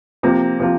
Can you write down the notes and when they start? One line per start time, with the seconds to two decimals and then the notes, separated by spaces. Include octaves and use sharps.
0.23 C3 F3 A#3 F4
0.60 C3 F3 A#3 F4